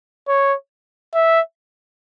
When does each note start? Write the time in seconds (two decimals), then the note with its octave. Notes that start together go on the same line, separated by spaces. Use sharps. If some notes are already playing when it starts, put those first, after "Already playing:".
0.28 C#5
1.14 E5